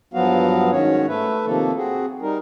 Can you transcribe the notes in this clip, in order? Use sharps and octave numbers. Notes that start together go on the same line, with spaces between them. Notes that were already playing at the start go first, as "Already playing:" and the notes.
G2 F3 F#3 B3 F#4 F5
G#2 D#3 C#4 F#4 C#5
A3 B4 E5
C3 D#3 F3 A#3 A4
C4 F#4 G#4
G3 D#4 A#4